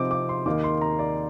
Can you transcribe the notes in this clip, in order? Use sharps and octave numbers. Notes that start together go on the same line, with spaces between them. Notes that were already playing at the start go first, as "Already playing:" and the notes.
Already playing: C3 F3 C4 D#4 D6
D6
C6
D#2 D#3 A#3 D#4 D6
C6
A#5
D5